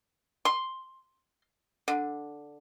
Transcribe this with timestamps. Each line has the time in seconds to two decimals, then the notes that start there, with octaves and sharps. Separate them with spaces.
0.45 C6
1.88 D3